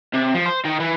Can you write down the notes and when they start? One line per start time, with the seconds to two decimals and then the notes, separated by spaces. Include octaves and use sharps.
0.14 C3
0.34 F3
0.46 C5
0.65 D#3
0.80 E3